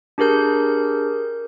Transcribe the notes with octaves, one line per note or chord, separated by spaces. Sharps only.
D4 G4 G#4 A#4 G6